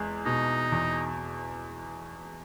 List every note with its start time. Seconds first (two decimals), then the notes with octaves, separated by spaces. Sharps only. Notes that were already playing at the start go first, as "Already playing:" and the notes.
Already playing: E2 G#3
0.25 B2 D#4
0.72 E2